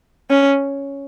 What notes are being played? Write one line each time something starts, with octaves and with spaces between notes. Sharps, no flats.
C#4